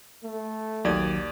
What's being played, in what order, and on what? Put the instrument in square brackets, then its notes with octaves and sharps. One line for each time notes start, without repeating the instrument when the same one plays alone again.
[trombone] A3
[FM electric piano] A#1 D#3 F#3 [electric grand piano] D#2 D5 G#6